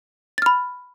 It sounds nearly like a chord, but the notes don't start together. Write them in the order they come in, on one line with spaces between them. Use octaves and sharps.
A6 F6 B5